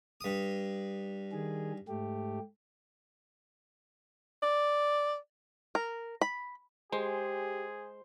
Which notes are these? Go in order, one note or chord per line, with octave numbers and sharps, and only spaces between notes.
G2 D#6
D#3 G#4
G#2 A3 G4
D5
A#4
B5
G#3 G4 G#4 C5